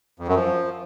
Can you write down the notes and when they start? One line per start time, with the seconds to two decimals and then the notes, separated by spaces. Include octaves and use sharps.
0.19 F2
0.27 F#2
0.36 F3